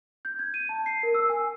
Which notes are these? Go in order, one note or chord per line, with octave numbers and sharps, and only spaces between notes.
G6
G#6
D#7
A5
C7
A#4
E6
G#5